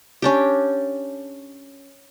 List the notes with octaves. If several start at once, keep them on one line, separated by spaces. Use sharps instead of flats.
C#4 D4 G4